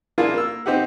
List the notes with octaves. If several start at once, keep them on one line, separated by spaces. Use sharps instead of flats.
A#3 D4 E4 F4 G#4
A#3 E6
C4 D#4 G4 F#5